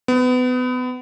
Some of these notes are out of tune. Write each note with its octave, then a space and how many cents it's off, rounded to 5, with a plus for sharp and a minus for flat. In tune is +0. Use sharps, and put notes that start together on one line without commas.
B3 +30